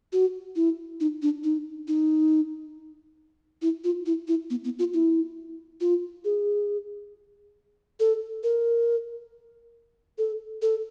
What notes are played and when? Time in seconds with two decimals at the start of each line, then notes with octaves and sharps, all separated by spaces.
0.13 F#4
0.56 E4
1.00 D#4
1.22 D4
1.43 D#4
1.88 D#4
3.62 E4
3.84 F4
4.06 E4
4.28 E4
4.50 B3
4.64 B3
4.79 F4
4.94 E4
5.81 F4
6.25 G#4
8.00 A4
8.43 A#4
10.18 A4
10.62 A4